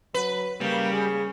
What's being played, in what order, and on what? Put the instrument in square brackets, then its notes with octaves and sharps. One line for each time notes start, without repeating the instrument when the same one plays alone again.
[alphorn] F#3 [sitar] B4
[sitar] C#3 [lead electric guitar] G3 [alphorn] A#3
[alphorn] G#4